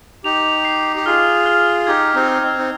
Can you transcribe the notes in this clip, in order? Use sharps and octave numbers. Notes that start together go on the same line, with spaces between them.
D#4 G4 F7
C7
G4
F4 G#4 F6
F6
D#4 G4 G#6
C4 D#4
F6
C4
D#4